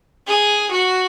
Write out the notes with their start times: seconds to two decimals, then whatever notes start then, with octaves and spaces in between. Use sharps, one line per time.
0.28 G#4
0.71 F#4